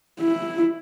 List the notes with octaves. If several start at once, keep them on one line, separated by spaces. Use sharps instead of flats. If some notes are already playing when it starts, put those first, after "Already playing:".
E4